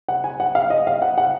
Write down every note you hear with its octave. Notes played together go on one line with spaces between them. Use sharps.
F#5
G#5
F#5
F5
D#5
F5
F#5
F#5